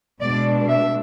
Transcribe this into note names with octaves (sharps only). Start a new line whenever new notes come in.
B2 G#3 D4 D5
E5